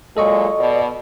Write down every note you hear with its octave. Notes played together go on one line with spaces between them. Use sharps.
A#2 F#3 G#3 A4 D#5 C#6
B2 D5